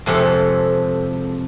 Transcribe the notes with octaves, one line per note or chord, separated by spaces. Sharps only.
F2 C3 G#3 A4